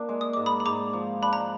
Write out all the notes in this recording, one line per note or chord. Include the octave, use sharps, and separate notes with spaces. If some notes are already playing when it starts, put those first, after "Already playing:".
Already playing: A#3 D4
G#3
D#6
G#2 D6
B5 D#6
B5
G#2 A#5 D6
F3
D4 B5
A#5